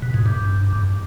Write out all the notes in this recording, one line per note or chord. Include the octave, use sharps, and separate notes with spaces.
B2
G#2
G2